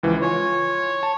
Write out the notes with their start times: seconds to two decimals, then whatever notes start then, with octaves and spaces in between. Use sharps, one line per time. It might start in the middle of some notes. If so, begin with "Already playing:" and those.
0.03 C#2 E3 F3
0.22 F4 C#5 G#5
1.03 A5